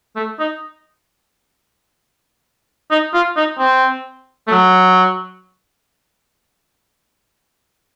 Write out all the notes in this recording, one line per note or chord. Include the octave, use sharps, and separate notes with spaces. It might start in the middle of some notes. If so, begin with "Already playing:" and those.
A3
D#4
D#4
F4
D#4
C4
A3
F#3